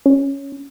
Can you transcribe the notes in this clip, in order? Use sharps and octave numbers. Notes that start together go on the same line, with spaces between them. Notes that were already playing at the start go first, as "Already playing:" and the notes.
C#4